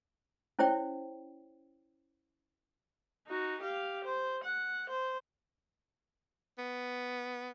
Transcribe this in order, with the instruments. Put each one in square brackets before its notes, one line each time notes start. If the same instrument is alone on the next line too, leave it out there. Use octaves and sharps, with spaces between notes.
[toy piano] C#4 E4 C5 C#5 G5
[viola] D#4 F#4
G4 F5
C5
F#5
C5
[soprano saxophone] B3